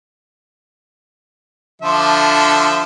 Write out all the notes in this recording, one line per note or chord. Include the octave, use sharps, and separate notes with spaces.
D3 F3 E5